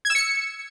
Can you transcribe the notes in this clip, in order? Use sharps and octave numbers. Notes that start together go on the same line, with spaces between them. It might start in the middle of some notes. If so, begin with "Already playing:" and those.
G#6
E6
C#7